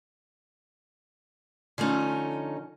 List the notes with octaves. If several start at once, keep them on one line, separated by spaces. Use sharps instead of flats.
D3 F3 A3 C#4 D#4